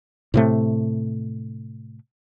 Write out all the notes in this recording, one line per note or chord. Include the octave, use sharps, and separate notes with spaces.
A2 C3 A3